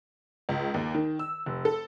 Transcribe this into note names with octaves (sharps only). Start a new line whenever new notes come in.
C#2
D#2
D#3
E6
F1
A4